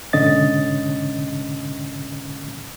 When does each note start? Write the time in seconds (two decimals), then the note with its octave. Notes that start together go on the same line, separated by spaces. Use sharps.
0.13 G#2 B2 D3 C#4 D#5 A6